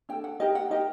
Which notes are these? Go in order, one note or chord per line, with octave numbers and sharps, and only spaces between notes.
D4 A4 G5
F#5
D#4 G4 A#4 D#5
F#5
D#4 G4 A#4 D#5